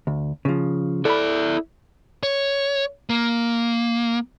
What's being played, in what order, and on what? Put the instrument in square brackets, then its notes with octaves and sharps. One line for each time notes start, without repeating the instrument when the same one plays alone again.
[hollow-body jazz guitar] D2
C#3 F3
[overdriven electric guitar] E4 D5 [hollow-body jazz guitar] A4 B5
[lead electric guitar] C#5
A#3